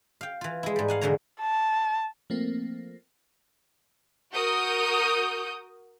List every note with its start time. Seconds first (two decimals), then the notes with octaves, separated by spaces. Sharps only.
0.21 F5 G5
0.41 E3 F4
0.63 G#3 E4
0.76 G#2 G3
0.88 F5 F#5 G#5
1.01 E2 B2 D3 G#3 C#5 A#5
1.40 A5
2.30 F3 A3 A#3 C4
4.33 F#4 A#4 D#6 G6